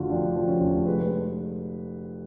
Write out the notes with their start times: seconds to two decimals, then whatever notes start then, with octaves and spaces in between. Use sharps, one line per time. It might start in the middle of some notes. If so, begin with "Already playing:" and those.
Already playing: F1 D3 F3 F4 F#4
0.10 F2 D4
0.35 F3
0.48 C#4
0.60 F1
0.86 G#3 B4